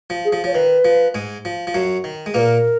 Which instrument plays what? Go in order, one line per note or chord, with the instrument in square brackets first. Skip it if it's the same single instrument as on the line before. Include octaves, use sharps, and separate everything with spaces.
[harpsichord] F3
[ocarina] G#4
[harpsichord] F3
[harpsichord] F3 [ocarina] C#5
[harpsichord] D#3 [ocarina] B4
[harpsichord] F3
G#2 G#3
F3
F3
F#2 F#3
D#3
G#3
[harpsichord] A#2 A#3 [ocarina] A#4 B4